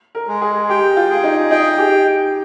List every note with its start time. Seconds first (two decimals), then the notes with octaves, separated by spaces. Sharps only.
0.15 A#4
0.28 G#3
0.41 G#4
0.69 G4 G5
0.97 F4
1.10 G#4
1.24 D#4
1.51 D#4 G5
1.78 G4